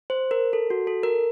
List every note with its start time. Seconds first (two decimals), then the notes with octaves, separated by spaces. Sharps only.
0.10 C5
0.31 A#4
0.53 A4
0.70 F#4
0.87 A4
1.03 A#4